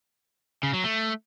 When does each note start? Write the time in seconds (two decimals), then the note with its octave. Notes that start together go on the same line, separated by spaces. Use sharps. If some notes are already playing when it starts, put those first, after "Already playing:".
0.63 C#3
0.73 F#3
0.84 A3